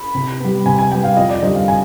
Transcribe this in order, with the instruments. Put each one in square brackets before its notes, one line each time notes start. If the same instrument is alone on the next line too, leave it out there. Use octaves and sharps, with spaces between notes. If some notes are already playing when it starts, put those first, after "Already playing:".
Already playing: [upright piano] B5
C3
G3 B3
C3 G#5
G#5
G3 B3 G5
F5
F2 D#5
D5
D3 G3 C4 D#5
F5
G#5